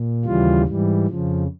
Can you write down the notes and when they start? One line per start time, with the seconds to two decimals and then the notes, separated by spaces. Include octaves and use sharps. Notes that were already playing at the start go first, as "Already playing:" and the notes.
Already playing: A#2
0.25 D#2 C#3 E3 G3 F4
0.66 G#2 E3 G3
1.06 F2 C#3 F3